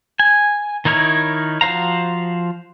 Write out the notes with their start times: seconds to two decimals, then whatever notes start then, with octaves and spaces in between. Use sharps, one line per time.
0.20 G#5
0.85 D#3 D#4 E4 A#4 C#5
1.61 F3 F#4 C5 F5 A#5